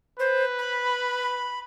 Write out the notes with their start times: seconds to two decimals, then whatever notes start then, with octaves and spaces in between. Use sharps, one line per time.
0.20 B4 C5
0.59 B5